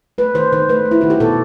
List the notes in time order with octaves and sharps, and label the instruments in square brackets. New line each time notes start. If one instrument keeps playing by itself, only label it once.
[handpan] A3 B4
D#3 C5
D#3 C5
A3 B4
A3
E4
D#3 F#4
G4
B2 A4